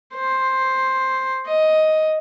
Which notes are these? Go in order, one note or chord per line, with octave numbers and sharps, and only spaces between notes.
C5
D#5